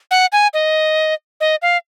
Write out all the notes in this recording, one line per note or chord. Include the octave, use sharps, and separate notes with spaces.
F#5
G#5
D#5
D#5
F5